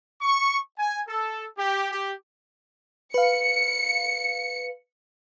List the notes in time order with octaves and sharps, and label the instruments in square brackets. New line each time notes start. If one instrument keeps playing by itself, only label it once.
[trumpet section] C#6
G#5
A4
G4
G4
[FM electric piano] B4 F5 [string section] C#7